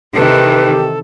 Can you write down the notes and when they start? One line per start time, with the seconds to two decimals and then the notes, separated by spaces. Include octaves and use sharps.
0.15 C3 D#3 E3 G4 A4 B4